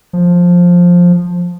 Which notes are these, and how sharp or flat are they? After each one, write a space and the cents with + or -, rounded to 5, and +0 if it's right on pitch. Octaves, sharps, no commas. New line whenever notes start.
F3 +10